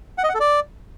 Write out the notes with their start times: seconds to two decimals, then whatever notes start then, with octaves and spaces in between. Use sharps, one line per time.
0.18 F#5
0.24 D#5
0.29 F#5
0.35 A4
0.40 D5